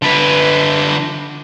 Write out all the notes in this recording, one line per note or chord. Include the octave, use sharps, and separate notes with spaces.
D3 B4